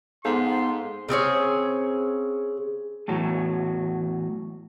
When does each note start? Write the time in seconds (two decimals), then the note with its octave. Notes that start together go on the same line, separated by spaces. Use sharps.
0.25 G#2 B3 A4 C5 F5 C6
1.09 C#3 C4 G#4 C#5
3.08 E2 A2 F#3